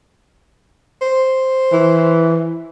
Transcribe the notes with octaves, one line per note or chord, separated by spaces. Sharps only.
C5
E3